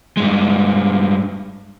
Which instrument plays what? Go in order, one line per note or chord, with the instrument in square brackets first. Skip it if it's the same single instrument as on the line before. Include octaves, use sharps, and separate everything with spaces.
[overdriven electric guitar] G2 G#3